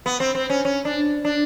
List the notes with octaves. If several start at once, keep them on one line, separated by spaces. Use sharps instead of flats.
B3
C4
C4
C#4
C#4
D4
D4